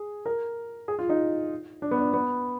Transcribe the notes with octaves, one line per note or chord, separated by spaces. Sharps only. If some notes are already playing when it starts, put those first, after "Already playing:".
Already playing: G#4
A#4
G#4
F4
D#4
D4
B3
D4
B3